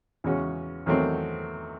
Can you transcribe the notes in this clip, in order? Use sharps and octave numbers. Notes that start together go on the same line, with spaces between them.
E2 C#3 G#3 C#4 F#4
E2 D#3 F#3 A3 C4